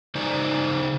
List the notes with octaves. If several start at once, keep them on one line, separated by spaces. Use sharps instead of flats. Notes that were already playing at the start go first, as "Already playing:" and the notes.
C#3 D#4 C5 D5 G#5